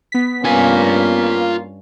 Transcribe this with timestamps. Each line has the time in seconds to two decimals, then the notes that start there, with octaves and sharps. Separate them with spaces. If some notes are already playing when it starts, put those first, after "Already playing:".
0.12 B3 B6
0.44 G2 A#3 C#4 F4 G#5